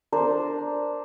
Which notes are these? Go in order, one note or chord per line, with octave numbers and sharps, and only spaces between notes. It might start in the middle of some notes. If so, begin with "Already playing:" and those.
D4 A#4 C5